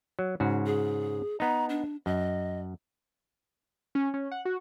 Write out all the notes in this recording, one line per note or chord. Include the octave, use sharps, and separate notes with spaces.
F#3
G#2 C#3 F#4
G#4
B3 D#4 A#5
D4
F#2 D#5
C#4
C#4
F#5
F#4